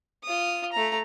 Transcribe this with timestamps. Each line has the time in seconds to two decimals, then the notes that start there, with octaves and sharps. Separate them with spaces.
0.24 F4 D#6
0.72 A3 A#5